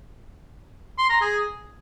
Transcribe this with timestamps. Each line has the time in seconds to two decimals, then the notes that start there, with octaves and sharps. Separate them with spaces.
0.98 C6
1.10 A#5
1.21 G#4